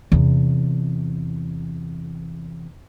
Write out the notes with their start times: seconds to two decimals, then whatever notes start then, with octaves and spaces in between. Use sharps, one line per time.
0.12 E2 C3